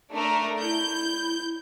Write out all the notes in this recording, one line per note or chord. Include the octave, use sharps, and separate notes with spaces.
A3 D4 A#4
E4 G6